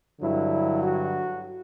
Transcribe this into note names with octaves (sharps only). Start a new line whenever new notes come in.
G2 D3 F#3 E4
F#4